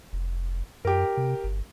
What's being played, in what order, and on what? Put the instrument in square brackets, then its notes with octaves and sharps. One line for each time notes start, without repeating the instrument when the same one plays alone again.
[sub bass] F1
[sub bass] F#2 [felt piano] G4 A#4
[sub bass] C3
G1